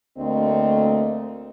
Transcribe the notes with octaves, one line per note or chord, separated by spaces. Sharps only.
D2 A3 A#3 C4 D#5